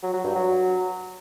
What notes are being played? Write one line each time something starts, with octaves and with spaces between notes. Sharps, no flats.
F#3
F#3
G2
F#3